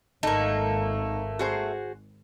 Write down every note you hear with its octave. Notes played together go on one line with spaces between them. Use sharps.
G#1 A3 A#3 D#4
F#4 G#4 C5